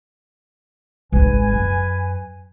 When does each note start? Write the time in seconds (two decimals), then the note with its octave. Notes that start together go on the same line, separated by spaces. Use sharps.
1.12 G#1 G#3 B4 G#5
1.53 F#2